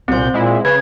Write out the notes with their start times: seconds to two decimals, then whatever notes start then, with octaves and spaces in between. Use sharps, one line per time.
0.08 C2 A#2 C4 C5 G6
0.34 A#2 G#3 E4
0.65 C#3 B4 G#6